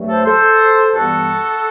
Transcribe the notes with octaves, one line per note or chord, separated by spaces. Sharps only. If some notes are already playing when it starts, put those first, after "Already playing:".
Already playing: G2 F#3 A3
A4 C5
A4 C5
G2 E3 G3 B3 F#4 A4